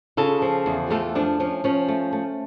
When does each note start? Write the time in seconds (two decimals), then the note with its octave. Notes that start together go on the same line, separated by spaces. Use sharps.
0.17 C#3 F4 A4
0.42 F3
0.66 E2
0.91 A3 F4 A4
1.15 F3 D4
1.40 F3 C#4
1.64 F3 C#4
1.88 A3
2.13 A3